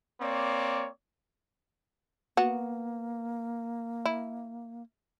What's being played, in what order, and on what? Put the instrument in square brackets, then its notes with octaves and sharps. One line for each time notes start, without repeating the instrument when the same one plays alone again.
[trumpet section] A#3 C4 C#5 D5
[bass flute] A#3 [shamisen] B3 F#4
[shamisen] E4